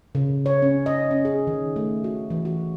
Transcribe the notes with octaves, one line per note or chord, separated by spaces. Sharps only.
C#3
C#5
C#4
D#5
C#4
G#4
D#3
A3
F#4
E3
F#4